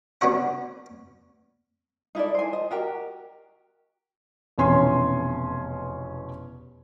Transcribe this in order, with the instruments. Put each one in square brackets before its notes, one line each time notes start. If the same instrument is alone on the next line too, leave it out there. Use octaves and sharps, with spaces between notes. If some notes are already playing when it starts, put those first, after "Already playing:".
[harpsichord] B3 D4 F#4 C#5 F#5
[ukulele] D#4 E4 A4 D5
C5 G#5
D#5
F#4 G4 A#4
[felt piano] F1 E2 B2 C#4 G#5 C6